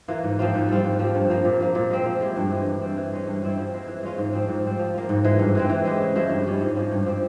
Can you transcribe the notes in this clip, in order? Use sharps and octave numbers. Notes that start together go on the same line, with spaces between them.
E3 A#3 F4
G#2
F3 C4 F4
G#2
G3 C4 F4
G#2
F3 C4 G4
G2
F3 A#3
A#2
F3 A#3
A#2
G#3 C4
F3
G#3 E4 G4
G2
E3 G#3
G2
G3 C4
E3
G#3 C#4
G2
G3 C4 E4
F3
G#3 C4
E3
G#3 C#4 F4
G#2
F3 C4
G#2
G3 C4
F3
A#3 F4
G#2
E3 G#3
G2
E3 G#3 C4
E3
G#3 E4 G4
C#3
F3 G#3 E4
G2
G3 C#4 G4
G#2
F3 G#3
G2
F3 C4 G4